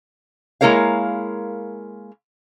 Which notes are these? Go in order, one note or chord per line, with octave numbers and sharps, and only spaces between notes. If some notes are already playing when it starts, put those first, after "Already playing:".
G#3 A#3 E4 A#4 C#5 F5